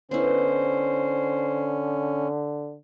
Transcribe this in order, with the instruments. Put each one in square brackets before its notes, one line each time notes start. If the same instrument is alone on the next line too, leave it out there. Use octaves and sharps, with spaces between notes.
[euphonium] D3 [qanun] B3 E4 [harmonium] C#4 [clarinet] C5